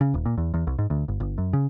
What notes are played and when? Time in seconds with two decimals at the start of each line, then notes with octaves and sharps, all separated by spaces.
0.01 C#3
0.14 D#1
0.25 A#2
0.38 E2
0.54 E2
0.67 C2
0.78 G#2
0.90 D2
1.08 G1
1.20 G1
1.38 F#2
1.53 C#3